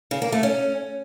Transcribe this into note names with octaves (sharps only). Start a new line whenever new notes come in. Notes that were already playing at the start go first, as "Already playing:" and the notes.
C#3
A#3
A3
C#4